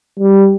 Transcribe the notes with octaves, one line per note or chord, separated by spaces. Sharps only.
G3